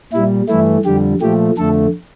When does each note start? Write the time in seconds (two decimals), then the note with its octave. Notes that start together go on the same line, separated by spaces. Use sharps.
0.13 A#2 G3 E4
0.49 G2 E3 A3 E4
0.85 F2 D3 G3 G4
1.21 A#2 F3 A3 G4
1.58 F2 D3 A3 A4